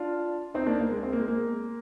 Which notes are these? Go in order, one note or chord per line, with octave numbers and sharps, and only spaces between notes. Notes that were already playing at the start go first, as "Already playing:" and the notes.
Already playing: D4 F4
C4 D#4
A#3 D4
A#3
G#3
C4
A#3
G#3
A#3